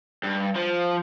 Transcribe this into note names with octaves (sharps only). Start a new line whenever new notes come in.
G2
F3